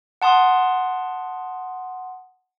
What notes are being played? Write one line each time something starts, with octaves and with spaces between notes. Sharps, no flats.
F#5 A5 C6 D#6